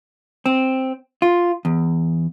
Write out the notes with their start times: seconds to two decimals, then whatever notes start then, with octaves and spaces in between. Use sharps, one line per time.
0.46 C4
1.22 F4
1.65 E2